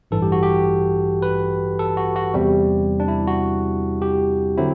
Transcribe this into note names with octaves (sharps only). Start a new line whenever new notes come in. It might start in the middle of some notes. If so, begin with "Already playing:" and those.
A1 G2 E3 A4
G4
F#4
G4
B4
A4
F#4
F#4
E2 C3 G3 C4
D4
E4
F#4
G4
D3 F#3 C4 E4